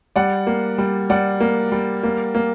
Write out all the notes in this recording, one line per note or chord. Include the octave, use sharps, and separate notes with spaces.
G3 D5 F#5
A#3
G3
G3 D5 F#5
A#3
G3
A#3
A#3